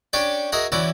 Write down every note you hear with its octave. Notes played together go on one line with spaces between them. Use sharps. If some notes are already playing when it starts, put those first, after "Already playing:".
C#4 D4 G4 C#5 D5 G5
F#4 G#4 A#4 D#5 E5
E3 C#4 E4 F#4 D5